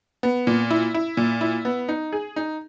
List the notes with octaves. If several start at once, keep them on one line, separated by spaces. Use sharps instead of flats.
B3
A#2
E4
E4
A#2
E4
B3
D#4
G#4
D#4